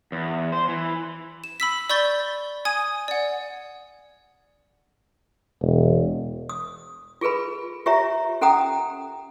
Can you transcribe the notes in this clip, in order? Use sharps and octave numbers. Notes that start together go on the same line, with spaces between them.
E2
C5
E3
E7
B5 E6 B6
D5 B5 C#6 G6 A6 G7
G#5 D#6 G#6 D#7
D5 F#5
E1
D#6
F4 G#4 A4 B4 B5
F4 G4 C#5 E5 A#5
C#4 A4 F#5 G5 A#5 D#6